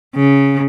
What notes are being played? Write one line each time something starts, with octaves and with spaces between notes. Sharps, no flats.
C#3